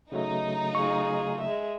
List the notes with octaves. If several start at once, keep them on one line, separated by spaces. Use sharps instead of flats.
C#3 F#3 A3 D#4
F4 G#4 C#6
G#3 E5